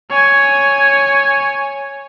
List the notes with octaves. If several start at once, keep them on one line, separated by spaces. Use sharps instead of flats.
C#5 G#5